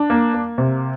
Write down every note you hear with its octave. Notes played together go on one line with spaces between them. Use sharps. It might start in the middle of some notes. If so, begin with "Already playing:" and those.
Already playing: D4
A#3
A#3
C3